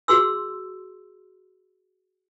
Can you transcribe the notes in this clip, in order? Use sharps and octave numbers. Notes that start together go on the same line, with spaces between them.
F#4 G#4 C6 E6